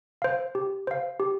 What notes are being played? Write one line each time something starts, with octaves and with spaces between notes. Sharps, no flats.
C5 F5
G4
C5 F5
G4